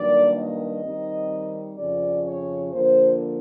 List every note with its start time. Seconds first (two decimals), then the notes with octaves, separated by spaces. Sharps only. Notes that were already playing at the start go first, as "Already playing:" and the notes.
Already playing: G2 D#3 F#3 A#3 D5
0.36 D#5
0.82 D#3 G3 C4 D#4
1.78 F2 C#3 F3 D5
2.25 C#5
2.72 D3 F3 A#3 C5